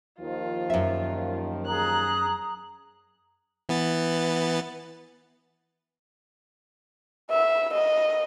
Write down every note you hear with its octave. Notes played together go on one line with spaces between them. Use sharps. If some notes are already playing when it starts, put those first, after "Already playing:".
D#2 D#3 F3 F4
F#2 E5
G#4 A#5 D#6 F#6
E3 B3 A6
E5
D#5